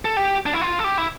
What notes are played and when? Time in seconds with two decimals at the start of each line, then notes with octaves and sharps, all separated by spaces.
0.05 A4
0.17 G4
0.46 D4
0.53 E4
0.61 F4
0.79 A4
0.84 G4
0.98 E4